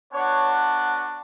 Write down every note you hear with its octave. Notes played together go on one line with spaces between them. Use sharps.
B3 D4 F#4 C#5